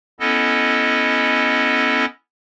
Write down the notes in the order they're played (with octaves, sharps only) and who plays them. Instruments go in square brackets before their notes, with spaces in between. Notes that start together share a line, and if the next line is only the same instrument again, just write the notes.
[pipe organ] B3 C#4 E4 A4 D#5